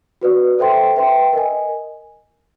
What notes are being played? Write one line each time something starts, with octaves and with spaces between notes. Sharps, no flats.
F#4 B4 D5
A4 C5 E5 G5 C6
B4 E5 G5 C6
A#4 D#5 G#5